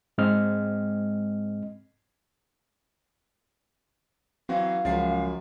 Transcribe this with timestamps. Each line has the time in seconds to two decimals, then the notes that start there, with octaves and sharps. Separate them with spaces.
0.18 G#2 G#3 C4 D#5 F6
4.49 E3 F#3 C4 F#4 F5
4.85 C#2 F#2 F3 A6 C7